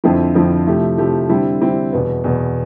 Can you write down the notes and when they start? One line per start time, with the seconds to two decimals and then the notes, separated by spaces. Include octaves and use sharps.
0.04 F2 D3 F3 C4 E4
0.35 F2 D3 F3 C4 E4
0.66 C3 F3 A3 E4 G4
0.98 C3 F3 A3 E4 G4
1.29 D3 G3 C4 E4
1.61 D3 G3 C4 E4
1.93 E2 B2 B3
2.24 E2 B2 B3